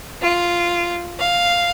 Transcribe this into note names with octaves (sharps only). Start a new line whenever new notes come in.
F4
F5